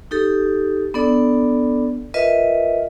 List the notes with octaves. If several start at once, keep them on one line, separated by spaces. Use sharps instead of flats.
D#4 G4 A4
B3 D4 A4 D5
F4 A#4 B4 D#5 E5